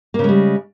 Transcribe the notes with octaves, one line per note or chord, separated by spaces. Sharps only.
C#3 G3 G#3 A#3